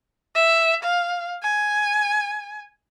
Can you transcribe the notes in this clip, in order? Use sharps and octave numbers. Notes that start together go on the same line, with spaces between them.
E5
F5
G#5